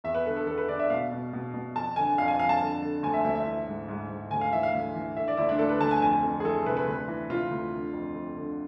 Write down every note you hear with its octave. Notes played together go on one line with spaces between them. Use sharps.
E2 E5
B4
D3 A4
A4
E2 A4
B4
D3 D5
E5
B2 F5
B2
B2
B2
F2 A5
D3 G#5
F2 F5
G#5
F2 F5
A5
D3
D3
D2 G#5
E5
D2 E5
E5
E3
G#2
G#2
G#2
D2 G#5
F5
E3 E5
F5
D2
E3
D3 E5
D5
D2 E4
D4
D2 A4
B4
D2 A5
G#5
F2 G#5
F2
G#4
E3 A4
C3 B4
B4
D2
E3
C3 F4
D2
D3
F2
F2
D3